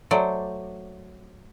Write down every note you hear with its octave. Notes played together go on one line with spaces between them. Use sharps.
F#3 A3 C5 D5